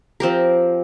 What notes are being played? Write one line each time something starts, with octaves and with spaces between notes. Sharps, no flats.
F3 C4 G4 A#4